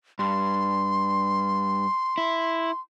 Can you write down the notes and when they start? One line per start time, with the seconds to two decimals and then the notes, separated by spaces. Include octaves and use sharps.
0.19 G2 C6
2.18 E4